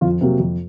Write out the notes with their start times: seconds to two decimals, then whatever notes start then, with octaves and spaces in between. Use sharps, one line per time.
0.01 F2 F4
0.21 C3 F#3 A#3
0.40 F2